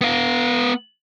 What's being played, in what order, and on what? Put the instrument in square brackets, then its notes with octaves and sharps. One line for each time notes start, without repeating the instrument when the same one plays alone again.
[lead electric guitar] B3 F5